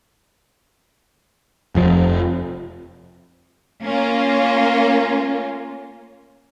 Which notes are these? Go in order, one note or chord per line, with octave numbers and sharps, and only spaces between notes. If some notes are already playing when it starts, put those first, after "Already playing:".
F1 F2 F3
A#3 C#4 F4